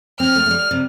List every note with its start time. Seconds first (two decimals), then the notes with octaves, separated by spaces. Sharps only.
0.19 C4 F6
0.35 A3
0.46 A3
0.50 G3
0.71 C3